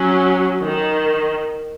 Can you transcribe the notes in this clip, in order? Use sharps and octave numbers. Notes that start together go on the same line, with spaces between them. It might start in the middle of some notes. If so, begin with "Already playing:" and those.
Already playing: F#3 C#4
D#3